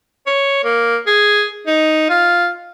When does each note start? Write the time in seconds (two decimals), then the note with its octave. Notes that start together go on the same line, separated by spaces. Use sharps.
0.26 C#5
0.64 A#3
1.07 G#4
1.66 D#4
2.09 F4